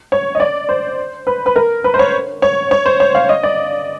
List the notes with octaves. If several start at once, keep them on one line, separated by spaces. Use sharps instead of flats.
C#5
D#5
D5
C5
B4
B4
A#4
B4
C5
C#5
C#5
C#5
C5
C#5
F5
D#5
D5